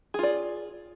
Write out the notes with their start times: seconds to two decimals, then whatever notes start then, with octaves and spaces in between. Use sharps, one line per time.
0.14 G#4
0.19 F4
0.23 D5